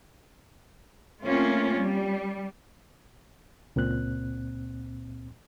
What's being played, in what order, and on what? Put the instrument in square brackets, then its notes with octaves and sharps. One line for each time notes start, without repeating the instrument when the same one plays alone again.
[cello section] A3 A#3 C4 C#4 F4
G3
[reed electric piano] C#2 A#2 C4 F#6